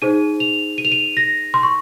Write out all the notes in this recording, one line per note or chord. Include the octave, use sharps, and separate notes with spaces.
D#4 G#4 C5 D#7
F7
D#7
F7
D#7
A#6
C6
C#6